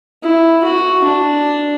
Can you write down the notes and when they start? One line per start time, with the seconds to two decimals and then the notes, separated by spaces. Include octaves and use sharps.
0.23 E4
0.64 F#4
1.04 D4